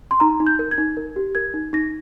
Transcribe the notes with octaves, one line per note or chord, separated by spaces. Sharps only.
C6
D#4 A#5
D#4
G6
A#4
G#6
D#4
A#4
G4
A#4 G#6
D#4
D#4 A#6